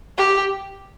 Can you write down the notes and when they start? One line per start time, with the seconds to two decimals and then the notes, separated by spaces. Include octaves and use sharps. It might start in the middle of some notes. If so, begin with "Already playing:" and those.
0.18 G4